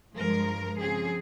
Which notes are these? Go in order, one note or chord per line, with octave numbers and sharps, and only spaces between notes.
G2 F3 G#3 A#4
C#3 F3 C4 G#4